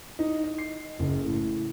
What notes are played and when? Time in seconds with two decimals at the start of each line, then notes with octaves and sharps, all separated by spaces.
0.19 D#4
0.44 D#5
0.58 C7
0.99 F#1
1.22 A2